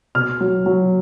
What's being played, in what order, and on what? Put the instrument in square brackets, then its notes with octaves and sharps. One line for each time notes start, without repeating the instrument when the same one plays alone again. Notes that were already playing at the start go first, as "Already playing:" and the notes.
[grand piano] B2 F6
F#3
F#3